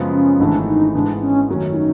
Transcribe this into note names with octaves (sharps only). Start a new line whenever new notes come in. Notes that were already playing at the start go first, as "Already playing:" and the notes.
Already playing: F#2 C#3 F3 G#3 B3
C#4
G#1 G#2 E3 A3 D4
D#4
G#2 E3 G#3 B3 D4
C#4
F#2 D#3 F#3 A3 C#4
E4
D#4